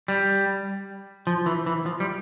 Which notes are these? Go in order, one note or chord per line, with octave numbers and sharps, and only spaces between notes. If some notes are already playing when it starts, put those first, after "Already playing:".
G3
F3
E3
E3
F3
G3